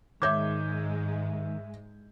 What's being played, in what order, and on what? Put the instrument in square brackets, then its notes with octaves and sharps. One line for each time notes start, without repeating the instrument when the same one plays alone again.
[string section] G#2 G#3 [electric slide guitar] D#3 [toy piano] C#5 D6 [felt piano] E5 G6 G#6